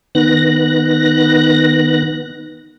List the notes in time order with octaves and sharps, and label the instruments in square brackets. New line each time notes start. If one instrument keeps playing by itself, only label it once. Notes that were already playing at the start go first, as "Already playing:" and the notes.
[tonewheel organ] D#3 B3 F#6 A#6